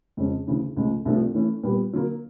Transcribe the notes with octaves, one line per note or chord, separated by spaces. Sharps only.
F2 C#3 F3 G#3 C#4
D2 C#3 E3
C#2 C#3 F3 A3
C2 C3 F3 A3 D4
E3 A3 C#4
A#2 G3 B3
D3 F#3 A#3